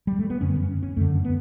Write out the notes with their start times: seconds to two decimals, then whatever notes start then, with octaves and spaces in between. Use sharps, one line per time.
0.07 G3
0.19 A3
0.30 B3
0.41 F#2 D3 C#4
0.56 C#4
0.83 C#4
0.96 F#2 D3 A3
1.25 B3